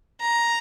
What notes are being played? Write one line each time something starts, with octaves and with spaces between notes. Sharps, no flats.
A#5